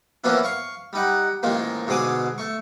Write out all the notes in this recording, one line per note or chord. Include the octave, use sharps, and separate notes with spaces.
E3 F3 A#3 B3 C#4 E4
F5 C#6
G3 D#4 F#5
A1 D#3 F3 G#3 A#3
G#2 B2 D3 G#4 D6 D#6
A3 C#6